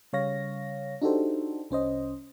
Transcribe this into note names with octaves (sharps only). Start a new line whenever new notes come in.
C#3 G3 C#5 F5 A#6
D4 D#4 F#4 G4 A4 C5
C2 C#4 C5 D#5